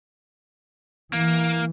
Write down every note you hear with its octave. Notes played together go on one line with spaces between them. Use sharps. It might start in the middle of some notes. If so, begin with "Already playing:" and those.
E3 A#3